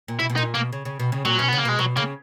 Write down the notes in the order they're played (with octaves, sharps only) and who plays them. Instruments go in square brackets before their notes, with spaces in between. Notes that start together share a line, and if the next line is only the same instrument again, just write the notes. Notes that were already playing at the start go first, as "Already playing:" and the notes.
[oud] A#2
[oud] B2 [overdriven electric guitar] E4
[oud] B2
[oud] A#2 [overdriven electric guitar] D#4
[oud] B2 [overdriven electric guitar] A#3
[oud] C#3
C#3
B2
C#3
[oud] A#2 [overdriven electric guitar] F#3
[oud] B2 [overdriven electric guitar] C#4
[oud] C#3 [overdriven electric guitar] B3
[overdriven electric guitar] A#3
[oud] B2 [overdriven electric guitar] G#3
[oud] B2 [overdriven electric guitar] F#3
[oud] C#3 [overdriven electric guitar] A#3